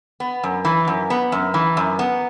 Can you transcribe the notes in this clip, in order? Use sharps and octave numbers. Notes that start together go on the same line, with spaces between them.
B3
F#2
E3
F#2
B3
F#2
E3
F#2
B3